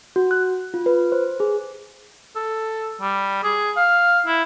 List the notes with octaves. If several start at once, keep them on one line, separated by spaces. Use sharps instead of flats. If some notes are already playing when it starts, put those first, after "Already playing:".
F#4
F#6
F4
B4
C5
G#4
A4
G3
G#4
F5
E4